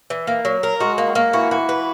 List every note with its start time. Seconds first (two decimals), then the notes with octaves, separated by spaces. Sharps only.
0.10 E3
0.27 A#3
0.45 F#3
0.63 A#4
0.80 G#3 F#4
0.98 A#3
1.08 F#3
1.15 A#3
1.33 E3 F#4
1.51 E3 F#4
1.69 B4